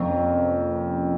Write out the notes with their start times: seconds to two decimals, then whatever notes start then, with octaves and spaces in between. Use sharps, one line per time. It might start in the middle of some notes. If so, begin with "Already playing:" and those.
Already playing: F2 C3 F3 A#3 C#4